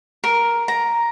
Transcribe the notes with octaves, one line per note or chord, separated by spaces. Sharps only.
A#4
A#5